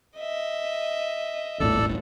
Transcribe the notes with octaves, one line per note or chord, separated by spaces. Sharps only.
D#5 E5
D#1 G#1 A2 A4 D5 E6